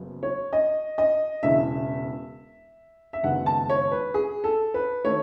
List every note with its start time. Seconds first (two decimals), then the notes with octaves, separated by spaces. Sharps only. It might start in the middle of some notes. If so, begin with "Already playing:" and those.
Already playing: F#1 F#2 C#3 F#3 B3
0.23 C#5
0.53 D#5
0.98 D#5
1.43 E1 E2 C#3 E5
3.13 E5
3.23 F#1 F#2 D#3 G#3 B3 F#5
3.46 A5
3.70 C#5
3.92 B4
4.14 G#4
4.44 A4
4.74 B4
5.04 D#3 A3 C#5